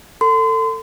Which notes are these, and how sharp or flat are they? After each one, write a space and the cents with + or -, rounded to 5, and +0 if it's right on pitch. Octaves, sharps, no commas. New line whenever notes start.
A4 +25 C6 -35